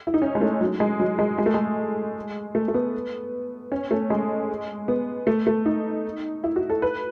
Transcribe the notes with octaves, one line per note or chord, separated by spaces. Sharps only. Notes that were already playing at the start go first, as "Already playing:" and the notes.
E4
D#4
C#4
G#3
A3
F#3
G#3
F#3
G#3
G#3
A3
G#3
A3
A3
B3
C#4
A3
G#3
B3
A3
A3
D#4
E4
F#4
A4
B4